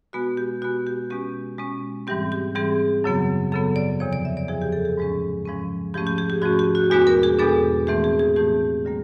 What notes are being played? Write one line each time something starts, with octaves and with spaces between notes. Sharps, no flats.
B2 G#3 B3 F#4
G4
B2 G#3 B3 F#4
G4
B2 G#3 C#4 G4
B2 G#3 C#4
G#2 E3 G3 C4 G4
G4
G#2 E3 G3 C4 G#4
F#2 C#3 F#3 B3
F#2 C#3 F#3 B3 A4
D5
E2 C3 F3 C#5
D5
E5
D5
E2 C3 F3 G#4
G4
A4
G#4
G#2 F3 G#3 C#4
G#2 F3 G#3 C#4
G#2 F3 A3 C#4 G4
G4
G#4
G4
G#2 F3 A3 C#4 F#4
G4
F#4
E2 B2 G#3 B3 D4 F#4
A#4
G#4
E2 B2 G#3 B3 D4 A4
A2 E3 A3 C4 G#4
G#4
G#4
A2 E3 A3 C4 G4
D3 G3 A#3